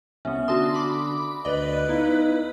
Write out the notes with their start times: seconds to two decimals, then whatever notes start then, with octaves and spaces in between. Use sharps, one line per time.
0.25 C2 B3 C#4 E5
0.48 D3 F#4 A5 C6 D#6 E6
0.74 B5 D6
1.45 D2 B4 D5 D#5
1.89 B3 D#4 E4 F5